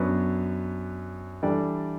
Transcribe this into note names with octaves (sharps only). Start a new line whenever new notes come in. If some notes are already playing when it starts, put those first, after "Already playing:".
Already playing: F#2 F#3 B3 D4
E3 G3 D4 A4 D5